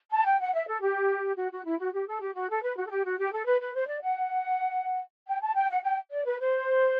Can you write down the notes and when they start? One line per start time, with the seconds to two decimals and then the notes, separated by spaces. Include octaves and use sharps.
0.11 A5
0.25 G5
0.40 F#5
0.53 E5
0.67 A4
0.81 G4
1.37 F#4
1.52 F#4
1.65 E4
1.79 F#4
1.93 G4
2.07 A4
2.21 G4
2.35 F#4
2.49 A4
2.63 B4
2.76 F#4
2.86 A4
2.90 G4
3.04 F#4
3.18 G4
3.32 A4
3.46 B4
3.60 B4
3.74 C5
3.88 D5
4.02 F#5
5.27 G5
5.41 A5
5.55 G5
5.70 F#5
5.83 G5
6.11 D5
6.25 B4
6.39 C5